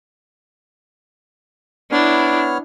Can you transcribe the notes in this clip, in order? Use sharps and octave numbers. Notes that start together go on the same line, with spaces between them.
B3 D4 E4 C#5 F6